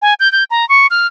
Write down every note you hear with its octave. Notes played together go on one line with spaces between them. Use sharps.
G#5
G6
G6
A#5
C#6
F6